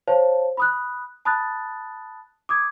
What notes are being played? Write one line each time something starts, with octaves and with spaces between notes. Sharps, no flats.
C5 C#5 F5 A5
B5 D#6 F#6
A5 B5 D#6 F#6 A6
D6 D#6 G#6